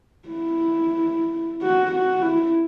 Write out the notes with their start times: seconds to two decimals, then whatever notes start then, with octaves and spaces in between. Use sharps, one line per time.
0.29 E4
1.62 F#4
1.92 F#4
2.22 E4